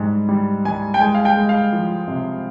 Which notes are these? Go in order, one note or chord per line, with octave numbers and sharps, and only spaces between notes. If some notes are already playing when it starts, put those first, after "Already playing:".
Already playing: G#2 G3
G3
G3 G#5
G5
G#3 G#5
F5
G5
G#3
F5
F3
C3